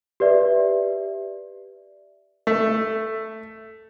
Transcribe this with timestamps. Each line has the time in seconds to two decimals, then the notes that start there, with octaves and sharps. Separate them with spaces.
0.20 G4 B4 D5 E5
2.47 A3